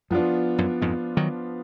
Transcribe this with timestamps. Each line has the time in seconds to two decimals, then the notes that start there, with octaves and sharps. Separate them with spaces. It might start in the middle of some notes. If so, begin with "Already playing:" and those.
0.10 F#2 F3 B3 D4 F4
0.58 F#2
0.82 F2 G#2
1.17 D#3 F#3